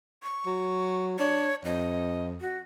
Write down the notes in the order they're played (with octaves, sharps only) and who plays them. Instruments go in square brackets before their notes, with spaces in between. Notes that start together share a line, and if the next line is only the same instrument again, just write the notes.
[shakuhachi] C#6
[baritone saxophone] F#3
[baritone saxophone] D4 [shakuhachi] C#5
[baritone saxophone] F2 [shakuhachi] D#5
[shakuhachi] F#4